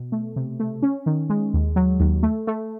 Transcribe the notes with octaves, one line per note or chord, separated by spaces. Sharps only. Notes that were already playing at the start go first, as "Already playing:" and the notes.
Already playing: B2
A3
C3
A3
C#4
D#3
G#3
D#2
F#3
D#2
A3
A3